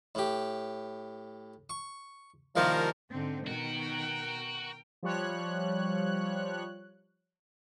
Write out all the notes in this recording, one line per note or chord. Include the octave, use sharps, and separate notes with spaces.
A2 G4
C#6
C2 D#3 F3 A#3 A#4
G#2 D3 C4
B2 D#3 F#4 A#4 G5
F3 G3 C#5 F#6